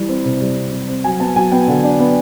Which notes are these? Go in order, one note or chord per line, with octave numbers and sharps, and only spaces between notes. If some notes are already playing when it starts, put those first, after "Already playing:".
Already playing: E3 G3
C4
C3
G3
C4
G3
C4
F#3 G#5
B3 A5
F#3 G#5
B3 G5
D3
D4
B3